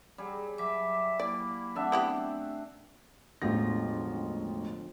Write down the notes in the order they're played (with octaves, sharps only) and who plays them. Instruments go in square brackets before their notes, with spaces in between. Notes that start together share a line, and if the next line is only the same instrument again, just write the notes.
[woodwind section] F#3 [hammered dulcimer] G3 G#4
[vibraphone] F#3 D6 [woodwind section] E5
[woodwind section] A#3 E4 [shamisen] D5
[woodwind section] A3 C4 [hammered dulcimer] D4 E5 F#5
[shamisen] B3 E4 G4
[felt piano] E1 A1 A#6 [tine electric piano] D3 F3